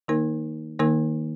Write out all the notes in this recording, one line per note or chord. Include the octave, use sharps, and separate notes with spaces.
D#3 A#3 D#4 A#4
D#3 A#3 D#4 A#4